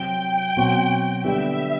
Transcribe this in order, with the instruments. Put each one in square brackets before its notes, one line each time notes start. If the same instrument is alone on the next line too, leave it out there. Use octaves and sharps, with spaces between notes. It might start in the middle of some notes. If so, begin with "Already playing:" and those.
Already playing: [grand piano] C3 F#3 C4 [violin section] G5
[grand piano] B2 F#3 C4 F#4
[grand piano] D3 G3 B3 [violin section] E5